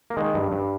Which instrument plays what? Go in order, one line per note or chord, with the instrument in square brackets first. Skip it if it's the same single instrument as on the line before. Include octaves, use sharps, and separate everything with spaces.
[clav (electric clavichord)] A#3
D#3 G#3
G2
G2